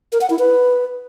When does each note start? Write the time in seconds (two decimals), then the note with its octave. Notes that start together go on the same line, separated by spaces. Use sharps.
0.12 A#4
0.21 F#5
0.30 E4
0.39 B4